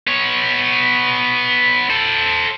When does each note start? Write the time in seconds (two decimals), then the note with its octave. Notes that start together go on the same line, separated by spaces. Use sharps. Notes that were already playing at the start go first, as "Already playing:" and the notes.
0.08 B3 C#5
1.90 A4 C5